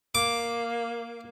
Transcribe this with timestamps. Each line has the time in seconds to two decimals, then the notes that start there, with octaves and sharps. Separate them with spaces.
0.15 A#3 D6